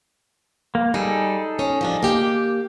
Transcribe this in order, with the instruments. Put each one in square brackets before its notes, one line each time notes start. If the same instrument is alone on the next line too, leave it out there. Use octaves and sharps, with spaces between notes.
[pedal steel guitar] A#3
[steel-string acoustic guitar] G3 [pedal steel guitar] D#4 G#4 A4
[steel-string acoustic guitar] C#4
F3 G3 D4
A#3 G4 G5